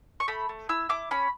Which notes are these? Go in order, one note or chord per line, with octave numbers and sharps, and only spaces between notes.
C#6
A3 B5
A3
E4 E6
E4 D6
C#4 B5